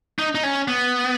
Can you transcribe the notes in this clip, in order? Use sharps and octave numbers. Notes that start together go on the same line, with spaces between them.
D#4
D#4
C#4
B3